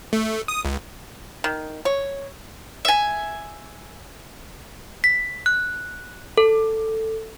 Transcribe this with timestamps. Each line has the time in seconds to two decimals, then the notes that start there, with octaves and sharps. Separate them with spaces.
0.13 A3
0.48 D#6
0.65 C#2
1.44 D#3
1.85 C#5
2.85 E5 G#5
5.04 B6
5.46 F#6
6.38 A4